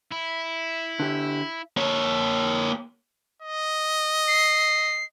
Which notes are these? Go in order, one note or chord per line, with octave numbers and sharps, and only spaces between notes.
E4
D3 G4
A#3 C#5
D#5
C7